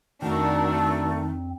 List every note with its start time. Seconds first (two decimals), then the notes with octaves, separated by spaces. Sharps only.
0.22 F2 D#3 A3 C4 D4 F#4 A#4